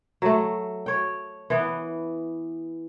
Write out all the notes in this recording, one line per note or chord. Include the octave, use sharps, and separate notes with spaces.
F#3 A3
C#5 G5
E3 B3